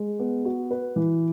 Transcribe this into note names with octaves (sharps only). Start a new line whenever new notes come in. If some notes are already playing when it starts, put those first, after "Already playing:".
Already playing: G#3
B3
F#4
B4
E3